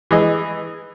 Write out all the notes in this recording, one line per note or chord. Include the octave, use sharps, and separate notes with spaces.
E3 G#4 D#5